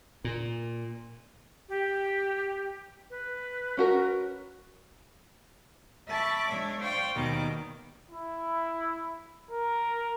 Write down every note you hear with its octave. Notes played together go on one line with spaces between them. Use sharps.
A#2
G4
B4
C#4 F#4 A#4
E5 A5 B5 C#6 D6
G#3 D4 C#5 E5
C5 D5 F5 G5 C#6
D#2 B2 D#3 G3 D6
E4
A#4